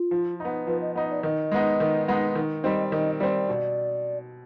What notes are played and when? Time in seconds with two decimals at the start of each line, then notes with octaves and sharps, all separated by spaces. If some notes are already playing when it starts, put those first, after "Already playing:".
Already playing: F4
0.11 F3
0.40 B3 D#4
0.67 F3 B4
0.81 D#5
0.96 B3 D#4 D#5
1.10 D5
1.23 D#3 D#5
1.51 G#3 B3 D#4
1.80 D#3
2.08 G#3 B3 D#4
2.35 D#3
2.64 G3 C4 D#5
2.92 D#3 D#5
3.20 G3 C4 D5
3.49 B2